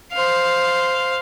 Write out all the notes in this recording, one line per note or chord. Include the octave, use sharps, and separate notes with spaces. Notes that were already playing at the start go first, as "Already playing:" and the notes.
C5 F5